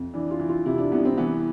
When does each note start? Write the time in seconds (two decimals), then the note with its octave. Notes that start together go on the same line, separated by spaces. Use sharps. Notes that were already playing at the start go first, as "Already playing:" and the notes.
Already playing: F2
0.14 E3 D4
0.31 F4
0.40 E3
0.49 F4
0.66 C3 E4
0.78 D4
0.92 C2 B3
1.05 C4
1.18 E3 B3